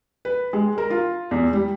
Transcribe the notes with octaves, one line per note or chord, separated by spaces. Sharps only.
B4
G#3
A#4
F4
E2
G3